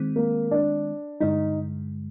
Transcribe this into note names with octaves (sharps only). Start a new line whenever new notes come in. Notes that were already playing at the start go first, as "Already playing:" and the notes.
Already playing: D#3 G#3 C4
A#3
D4
G2 D3 G#3 D#4